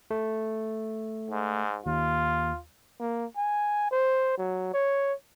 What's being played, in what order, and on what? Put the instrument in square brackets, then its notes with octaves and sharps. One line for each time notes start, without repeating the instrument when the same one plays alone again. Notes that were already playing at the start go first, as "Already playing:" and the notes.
[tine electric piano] A3
[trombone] G#2
[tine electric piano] D#2 [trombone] F4
[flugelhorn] A#3
G#5
C5
F#3
C#5